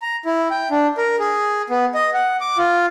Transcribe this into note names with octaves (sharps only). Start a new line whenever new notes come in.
A#5
E4
G5
D4
A#4
G#4
B3
D#5
F#5
D6
F4